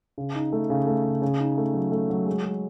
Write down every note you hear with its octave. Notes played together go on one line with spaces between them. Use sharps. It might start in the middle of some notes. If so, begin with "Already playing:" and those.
C#3
D#4
A3
C#3
A3
C#3
C#3
D#4
A3
F#3
A3
F#3
G#3
G#3